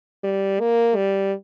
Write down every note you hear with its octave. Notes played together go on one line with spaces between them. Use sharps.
G3
A#3
G3